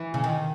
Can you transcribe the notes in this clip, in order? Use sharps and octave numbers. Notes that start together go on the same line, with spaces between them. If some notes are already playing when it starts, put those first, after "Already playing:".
Already playing: E3
C#3
D#3